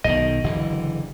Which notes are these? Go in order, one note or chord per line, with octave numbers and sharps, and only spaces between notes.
B1 B2 D#3 D#5
F#1 D3 E3